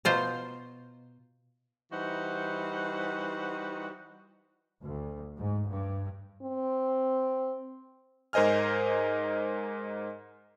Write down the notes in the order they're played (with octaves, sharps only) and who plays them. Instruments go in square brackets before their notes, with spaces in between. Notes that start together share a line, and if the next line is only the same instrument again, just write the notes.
[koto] B2 F4 C5 A#5
[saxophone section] E3 G3 D#4 F#4 C5 F#5
[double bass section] D2
G#2
G2
[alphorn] C4
[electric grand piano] G#2 A#4 C5 D#5 G#5 F6